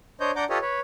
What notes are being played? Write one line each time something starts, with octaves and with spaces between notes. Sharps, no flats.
D4 C5 C#5 D#5 G6
D4 D5 F#5 A#5 D6 G6
F4 G4 A4 B4 C#5 D#5
B4 C#5